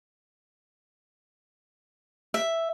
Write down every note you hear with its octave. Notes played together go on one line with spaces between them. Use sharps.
E5